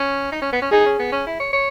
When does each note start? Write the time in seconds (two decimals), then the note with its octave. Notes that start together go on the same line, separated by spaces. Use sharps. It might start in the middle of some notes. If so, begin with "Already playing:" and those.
Already playing: C#4
0.32 D#4
0.42 C#4
0.52 B3
0.62 C#4
0.72 D#4 G#4
0.86 C#4
0.99 B3
1.12 C#4
1.27 E4
1.40 C#5
1.53 C#5